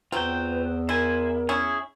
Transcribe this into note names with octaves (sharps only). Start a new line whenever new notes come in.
E2 F#3 C4 F4 B4 G5
E4 A#4 C5 G#5
C#4 E4 G#4